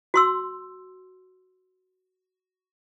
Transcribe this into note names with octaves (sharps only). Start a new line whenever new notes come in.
F#4 C6 E6